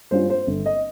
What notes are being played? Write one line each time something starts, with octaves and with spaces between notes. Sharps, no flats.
G2 G3 C#4 F4 C5
C5
G1
D#5